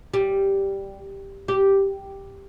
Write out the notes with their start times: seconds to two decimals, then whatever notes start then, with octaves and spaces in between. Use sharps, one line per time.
0.14 G3
1.48 G4